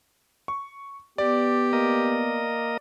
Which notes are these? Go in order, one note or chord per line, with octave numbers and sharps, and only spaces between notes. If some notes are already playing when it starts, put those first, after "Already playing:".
C#6
B3 G4 D5
A#3 A#4 D#5